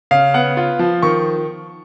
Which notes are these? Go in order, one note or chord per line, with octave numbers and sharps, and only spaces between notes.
C#3 F5
B3 F#5
F4
F3
D#3 C#6